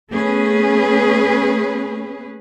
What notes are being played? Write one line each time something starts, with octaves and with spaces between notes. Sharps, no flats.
A3 B3 C#4 G#4 B4